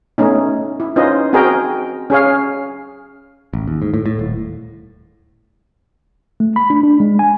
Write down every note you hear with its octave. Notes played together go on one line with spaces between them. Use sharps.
A3 B3 C#4 D#4
E4
C#4 D#4 F4 B4 C5 D#5
C4 F#4 G#4 A#4 D#5 G5
C#4 G#4 C#5 F5
A1
D#2
G#2
A2
A2
D#1
A3
B5
D4
D4
G#3
G#5